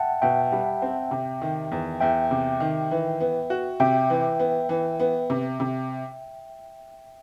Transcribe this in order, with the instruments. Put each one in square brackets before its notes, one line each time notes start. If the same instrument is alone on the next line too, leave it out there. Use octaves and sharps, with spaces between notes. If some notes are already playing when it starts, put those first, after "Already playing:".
Already playing: [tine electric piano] E5 F#5 G5 A5
[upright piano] B2 [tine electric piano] E5 G5
[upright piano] G3
C4
C3
D#3
E2
[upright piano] E2 [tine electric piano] E5 G5
[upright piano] C3
D#3
E3
B3
F#4
[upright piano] C3 [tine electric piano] E5 G5
[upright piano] E3
B3
E3
B3
C3
C3